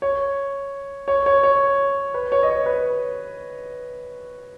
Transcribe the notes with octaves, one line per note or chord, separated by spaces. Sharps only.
C#5
C#5
C#5
C#5
B4
C#5
D#5
C#5
B4